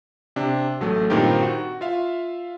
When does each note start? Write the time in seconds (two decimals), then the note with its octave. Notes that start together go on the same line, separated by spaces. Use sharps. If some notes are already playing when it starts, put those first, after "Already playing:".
0.36 C3 D4
0.80 A1 F#3 A3
1.10 G2 A#2 D#3 C4 D#4 G4
1.43 F#4
1.81 F4 E5 F5